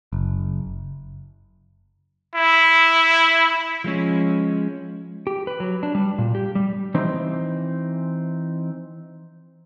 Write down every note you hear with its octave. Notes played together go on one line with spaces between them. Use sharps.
F#1
E4
F3 G#3 C#4
G4
B4
F#3
D4
G3
A#2
G4
G3
E3 C4 D#4 C5